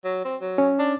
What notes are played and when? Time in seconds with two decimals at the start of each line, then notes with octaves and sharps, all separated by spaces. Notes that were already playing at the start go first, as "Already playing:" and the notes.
0.04 F#3
0.25 C4
0.41 F#3
0.58 C#4
0.79 D4